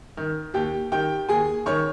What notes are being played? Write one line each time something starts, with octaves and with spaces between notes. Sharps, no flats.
D#3
D#2 G4 G5
D#3 G4 G5
D#2 G#4 G#5
D#3 C#5 C#6